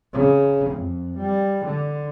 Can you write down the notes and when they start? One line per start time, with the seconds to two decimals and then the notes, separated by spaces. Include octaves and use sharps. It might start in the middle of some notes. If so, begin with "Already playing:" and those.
0.13 C#3
0.70 F2
1.18 G3
1.66 D3